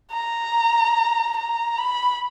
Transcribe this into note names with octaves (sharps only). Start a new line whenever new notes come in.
A#5
A#5
B5